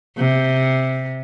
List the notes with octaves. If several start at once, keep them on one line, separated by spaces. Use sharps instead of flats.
C3